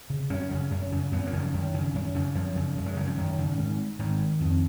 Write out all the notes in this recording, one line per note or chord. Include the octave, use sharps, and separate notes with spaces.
C#3
F#2 C#4
C#3
F#2
C#3
F#2 B3
A#3
C#3
F3
F#2 D#3
C#3
F#2
C#3
F#2 F3
C#3
F#2
G#3
C#3 F#3
F3
F#2 D#3
C#3
G#2
G#2 D#3
F2